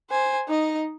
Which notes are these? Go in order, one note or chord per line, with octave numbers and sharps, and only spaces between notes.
C5 G#5
D#4 D#5